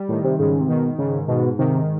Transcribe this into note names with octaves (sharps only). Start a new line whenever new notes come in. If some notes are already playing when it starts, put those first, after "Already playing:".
Already playing: G3
A2 D#3
C3
G#2 C#3
C3
B2 D#3
G#2 C#3
G#2 B2
C3 D#3